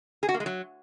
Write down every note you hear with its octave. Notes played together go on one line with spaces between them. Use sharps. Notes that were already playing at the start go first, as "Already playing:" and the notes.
G#4
F#4
A#3
G#3
F#3